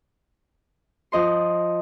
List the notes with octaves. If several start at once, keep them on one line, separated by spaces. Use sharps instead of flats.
F3 D#5 C6